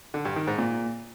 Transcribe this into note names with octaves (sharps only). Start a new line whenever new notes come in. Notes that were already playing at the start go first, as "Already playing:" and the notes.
D3
G2
D#3
G#2
A#2